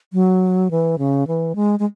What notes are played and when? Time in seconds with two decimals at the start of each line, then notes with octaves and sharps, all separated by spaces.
0.13 F#3
0.71 E3
0.98 C#3
1.27 E3
1.56 G#3
1.79 G#3